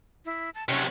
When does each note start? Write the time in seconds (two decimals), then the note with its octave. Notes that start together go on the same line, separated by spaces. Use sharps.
0.25 E4
0.54 A5
0.69 C3 F#3 C#4